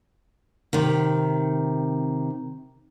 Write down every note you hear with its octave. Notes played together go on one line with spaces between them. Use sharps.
C3 D#3